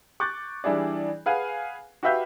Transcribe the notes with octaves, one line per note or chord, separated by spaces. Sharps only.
C#6 D6 F#6 G6 A6
E3 G3 D4 E4 G#4 D5
G#4 B4 F5 F#5 G#5
F#4 G4 B4 E5 F5 G6